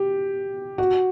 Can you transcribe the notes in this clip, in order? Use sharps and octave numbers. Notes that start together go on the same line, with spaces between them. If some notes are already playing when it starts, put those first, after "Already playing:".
Already playing: G4
F#4